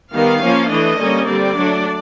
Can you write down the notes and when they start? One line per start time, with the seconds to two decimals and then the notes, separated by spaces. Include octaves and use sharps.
0.13 D#3 G3 B3 F5
0.42 F3 A#3 C#4
0.70 E3 A3 D4 D#5
0.99 D3 G3 A#3 C#4
1.27 D3 G3 C4 D5
1.55 F#3 A3 D4